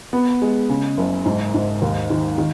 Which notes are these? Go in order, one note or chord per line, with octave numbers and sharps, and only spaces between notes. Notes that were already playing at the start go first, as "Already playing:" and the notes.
B3
G#3
C#3
F#1
G#2
G#2
D#2
D#3
D#3